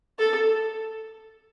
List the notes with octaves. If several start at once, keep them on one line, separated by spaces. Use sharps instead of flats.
A4